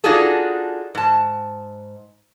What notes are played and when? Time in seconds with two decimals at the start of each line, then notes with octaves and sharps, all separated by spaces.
0.04 D4 D#4 F4 F#4 G#4 A4
0.95 G#2 A5